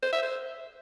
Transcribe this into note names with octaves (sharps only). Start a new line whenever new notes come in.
C5
E5
C5